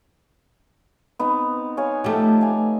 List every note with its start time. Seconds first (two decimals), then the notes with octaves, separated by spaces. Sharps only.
1.19 B3 C4 D#4
1.77 C#5 F5 G#5
2.04 F3 A3 G4 A4
2.41 F5 G#5